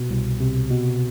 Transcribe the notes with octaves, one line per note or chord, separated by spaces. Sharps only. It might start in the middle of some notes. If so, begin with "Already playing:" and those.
Already playing: B2
C2
C3
B2